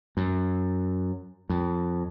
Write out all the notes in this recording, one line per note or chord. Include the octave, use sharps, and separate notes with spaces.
F#2
F2